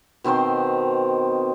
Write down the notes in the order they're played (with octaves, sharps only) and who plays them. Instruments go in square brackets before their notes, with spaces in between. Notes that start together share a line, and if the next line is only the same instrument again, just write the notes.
[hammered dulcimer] B2 D#3 C4 C5